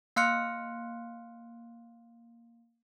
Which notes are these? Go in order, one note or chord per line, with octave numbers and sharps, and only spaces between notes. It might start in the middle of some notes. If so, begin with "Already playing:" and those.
A#3 F5 C6 F6 F#6 C#7